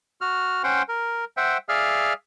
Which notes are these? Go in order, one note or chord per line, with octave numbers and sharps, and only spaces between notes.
F#4 F6
C#4 C5 F#5 G5 C6
A#4
C5 E5 F#5 G5
G#4 D5 E5 F5 F6